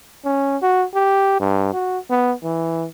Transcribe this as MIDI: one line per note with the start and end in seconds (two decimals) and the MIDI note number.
0.25 0.57 61
0.62 0.85 66
0.95 1.38 67
1.40 1.74 43
1.74 1.99 66
2.10 2.33 59
2.43 2.87 52